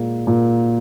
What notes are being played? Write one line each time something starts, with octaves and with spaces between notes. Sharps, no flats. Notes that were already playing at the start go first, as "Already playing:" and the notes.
Already playing: A#2 G#3
A#2